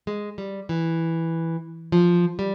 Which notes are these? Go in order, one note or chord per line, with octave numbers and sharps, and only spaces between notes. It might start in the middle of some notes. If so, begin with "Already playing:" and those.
G#3
G3
E3
F3
G3